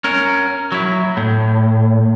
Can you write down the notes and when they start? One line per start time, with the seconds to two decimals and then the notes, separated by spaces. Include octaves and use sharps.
0.04 C#4 A#4
0.72 F#3 E4
1.17 A2